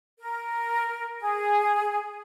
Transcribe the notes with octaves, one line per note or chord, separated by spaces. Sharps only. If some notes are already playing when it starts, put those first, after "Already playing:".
A#4
G#4